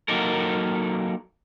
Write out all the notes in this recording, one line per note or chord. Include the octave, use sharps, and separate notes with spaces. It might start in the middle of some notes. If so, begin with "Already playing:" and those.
F#3 A#3 D#4 A4 A#4